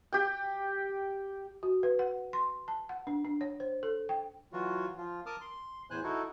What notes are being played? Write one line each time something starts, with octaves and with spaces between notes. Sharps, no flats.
G4 G5
F#4
B4
F#5
C6
A5
F#5
D4
D4
C#5
C5
A4
G5
E3 F#3 F4 F#4
F3 F4
A#4 A5 D6 D#6 F6
C6
E2 A2 E3 C5 G#5 F#6
D#4 E4 F#4 A4